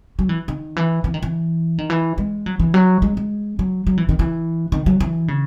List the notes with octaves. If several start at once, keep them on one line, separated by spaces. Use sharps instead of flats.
F#3
E3
D#3
E3
E3
D#3
E3
D#3
E3
G#3
F#3
E3
F#3
G#3
G#3
F#3
F#3
E3
D#3
E3
D#3
F#3
E3
C#3